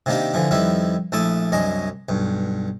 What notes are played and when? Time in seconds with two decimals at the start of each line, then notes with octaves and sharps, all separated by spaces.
0.06 C3 D#3 A#3 D4 G4
0.34 D3 E3 F3
0.51 F2 D#3 G3 E4 B4
1.12 A#1 A3 E4 A5 D6 D#6
1.52 C2 F#2 D4 D#5 G#5
2.09 B1 G2